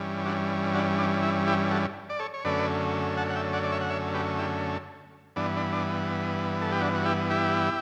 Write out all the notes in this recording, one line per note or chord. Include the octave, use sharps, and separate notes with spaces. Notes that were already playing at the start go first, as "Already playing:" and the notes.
Already playing: G2 E3 G3 C#4
D4 F#4
D4 F#4
D4
E4
E4 G4
F#4 A4
D5
A4 C#5
C#5
F#2 D3 A3 C#4 B4 D5
F#5 A5
F#5
E5 G5
D5 F#5
D5
C#5 E5
F#5
C#5 E5
G4 B4
E4 G4
G2 E3 B3 D4
D4
D4
A4
G4
D4 F#4
F#4
E4 G4
E4 G4